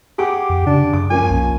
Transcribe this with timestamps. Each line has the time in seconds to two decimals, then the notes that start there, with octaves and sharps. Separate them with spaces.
0.18 G4 G#4 F#5 D6
0.50 F2
0.66 C#3 D4
0.93 F#2 D6
1.10 F3 A#3 C#4 G#5
1.30 B1